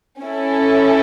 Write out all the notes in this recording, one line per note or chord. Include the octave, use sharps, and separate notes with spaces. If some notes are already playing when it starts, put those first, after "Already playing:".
C#4 E4 A4